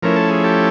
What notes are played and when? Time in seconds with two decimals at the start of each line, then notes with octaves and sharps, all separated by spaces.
0.02 F3 A3 C#4 E4 A#4
0.16 A4
0.30 G#4
0.44 G4 A4